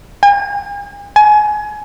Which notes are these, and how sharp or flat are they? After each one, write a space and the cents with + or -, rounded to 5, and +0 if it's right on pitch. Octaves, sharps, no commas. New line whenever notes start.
G#5 -45
G#5 +25